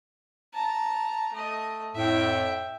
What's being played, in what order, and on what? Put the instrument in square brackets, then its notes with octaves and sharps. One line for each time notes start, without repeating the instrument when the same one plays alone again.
[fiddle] A5 A#5
A3 D#5
[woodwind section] F2 A2 [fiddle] E5 G5